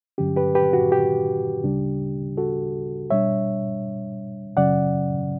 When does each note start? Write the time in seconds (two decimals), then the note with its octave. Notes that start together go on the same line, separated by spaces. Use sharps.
0.18 G2 D3 F#3 C#4 G4
0.36 G4 B4
0.55 G4 B4
0.73 F#4
0.92 G4
1.64 D2 C#3 G3 D4
2.37 F#4 A4
3.11 B2 G3 D4 C#5 E5
4.57 F#2 C#3 F#3 C#4 D5 F#5